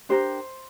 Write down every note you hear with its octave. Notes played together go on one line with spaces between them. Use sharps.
D4 G4 A#4 C5